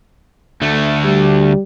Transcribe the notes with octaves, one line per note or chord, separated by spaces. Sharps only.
D2 A3
G3